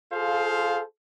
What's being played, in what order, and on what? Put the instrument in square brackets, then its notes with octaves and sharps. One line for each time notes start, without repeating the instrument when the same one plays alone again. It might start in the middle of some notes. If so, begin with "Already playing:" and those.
[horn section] F4 G#4 A4 C5 F5